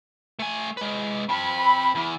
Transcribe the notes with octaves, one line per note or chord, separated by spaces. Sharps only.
A3 G#5
G#3 B4
C4 A5 B5
E2 E3